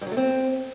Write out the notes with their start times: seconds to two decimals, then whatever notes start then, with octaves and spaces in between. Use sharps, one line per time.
0.01 G2
0.07 F#3
0.12 A3
0.17 C4